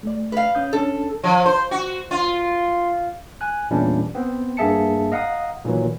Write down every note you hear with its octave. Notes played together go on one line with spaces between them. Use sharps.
A3 D5
B4 F5
C#4 D#6 G6
C#4 D4 A4
F3
C5
F#4
F4
G#5 F#6
E2 A#2 E3 G3 C#4 D4
B3 C4
G2 A#3 G#4 E5 A5 C#7
D#5 F5 F#5 A#5 D#6
A#2 D#3 E3 F#3